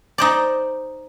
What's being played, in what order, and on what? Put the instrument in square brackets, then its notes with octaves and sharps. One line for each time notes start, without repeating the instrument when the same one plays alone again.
[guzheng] D#4 C5 D5